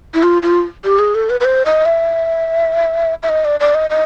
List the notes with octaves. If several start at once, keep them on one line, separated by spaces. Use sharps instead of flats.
E4
F4
F4
G4
G#4
A4
B4
B4
C5
D#5
E5
E5
D#5
D5
D5
D#5
D#5